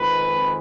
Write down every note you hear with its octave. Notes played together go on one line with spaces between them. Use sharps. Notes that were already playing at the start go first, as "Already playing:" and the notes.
Already playing: F2 D#3 G#3 B4